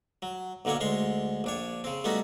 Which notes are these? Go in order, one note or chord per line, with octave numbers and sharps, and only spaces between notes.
F#3
B1 D3 F#3 A#3 C#5
D2 G#3 C#5 C6
A#1 D4 C#5
C#3 C4
G3 A3 B3 C#4 D#4 F#4